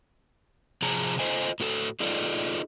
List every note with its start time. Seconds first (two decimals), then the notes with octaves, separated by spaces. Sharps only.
0.82 C3 F3 G#4 A5 A#5
1.19 F4 A4 C5 D#5 G#5
1.60 A2 F#4 A4
2.00 D#4 F4 G#4 A4 D5 D#5